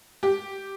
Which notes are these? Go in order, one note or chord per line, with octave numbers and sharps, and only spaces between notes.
G4